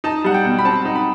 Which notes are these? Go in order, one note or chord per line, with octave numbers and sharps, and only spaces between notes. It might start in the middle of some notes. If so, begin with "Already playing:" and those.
D#4 A5
G3 F#5
G5
B2
B5
C4 A5
D#4
B5